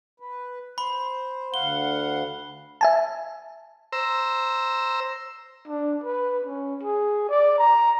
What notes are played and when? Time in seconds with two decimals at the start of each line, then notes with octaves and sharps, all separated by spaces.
0.20 B4
0.78 C5 B5
1.54 D2 F5 F#5 G7
2.81 E5 G#5 A5
3.92 C5 A#5 E6
5.67 D4
6.04 B4
6.44 C#4
6.83 G#4
7.29 D5
7.58 A#5